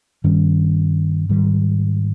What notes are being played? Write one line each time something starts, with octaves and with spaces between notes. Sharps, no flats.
G2 D#3 G3 C#4
G#2 D#3 G3